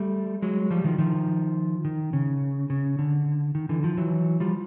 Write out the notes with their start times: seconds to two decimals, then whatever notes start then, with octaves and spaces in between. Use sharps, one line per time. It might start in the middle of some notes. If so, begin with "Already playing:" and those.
Already playing: G3 A3
0.42 F#3 G#3
0.70 F3 G3
0.84 D#3 F3
0.98 D#3 F3
1.85 D#3
2.13 C#3
2.70 C#3
2.99 D3
3.55 D#3
3.69 D3 E3
3.83 D#3 F3
3.97 E3 F#3
4.40 F3 G3